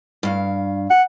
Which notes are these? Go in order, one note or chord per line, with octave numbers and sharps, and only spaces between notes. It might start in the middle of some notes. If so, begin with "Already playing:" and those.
G2 F5
F#5